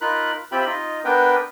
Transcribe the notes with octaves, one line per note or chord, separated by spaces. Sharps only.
D#4 F4 A#4 B5 F#6
C4 F4 G4 E5 G5 B5
D#4 F4 D#5
B3 D4 A#4 B4 G5